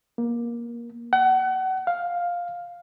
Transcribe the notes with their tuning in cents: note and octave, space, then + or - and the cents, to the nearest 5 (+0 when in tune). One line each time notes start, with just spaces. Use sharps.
A#3 +20
F#5 +30
F5 +5